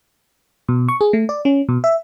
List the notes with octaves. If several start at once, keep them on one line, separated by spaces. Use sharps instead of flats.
B2
C#6
G#4
A3
D5
C#4
B2
E5